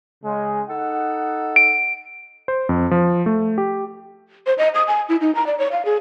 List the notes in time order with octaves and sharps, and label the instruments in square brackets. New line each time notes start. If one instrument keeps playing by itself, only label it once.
[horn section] C#3 G#3
D#4 A4 F#5
[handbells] D7
[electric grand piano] C5
F2
F3
A3
G4
[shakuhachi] C5
D#5
D#6
G#5
E4
D#4
A#5
D5
C#5
F5
G#4